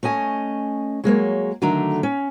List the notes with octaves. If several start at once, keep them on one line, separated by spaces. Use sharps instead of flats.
A3 C#4 D#5 G#5
F#3 G#3 A#3 C#5
D3 D#3 F#3 A3 D4 A#5
C#4